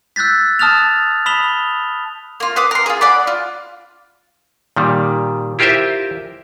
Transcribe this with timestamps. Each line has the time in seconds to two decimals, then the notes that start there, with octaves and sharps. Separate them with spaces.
0.16 E6 F#6 G6 A6 B6
0.59 A5 D#6 F6 A6 F7
1.26 B5 D#6 B6 E7 F7 G7
2.40 A#3 F4
2.56 B4 C5 D6 D#6
2.71 A#4 C6
2.86 F4 G#4
3.01 D5 F#5 B5 D6
3.27 F4
4.76 A#2 D#3 G3
5.59 E4 F4 G4 A#4 C5 E5